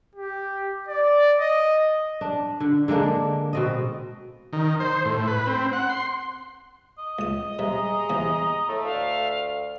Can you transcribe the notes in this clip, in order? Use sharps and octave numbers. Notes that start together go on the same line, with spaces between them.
G4
D5
D#5
D4
D3
D3 G#3 A#3 D4
B2 C4 D#5
D#3
C5
A2
B4
C4
F#5
C6
D#5
C#2 D#6
G2 C3 G#3 A#5
E2 C3
A2 A3
D2 F5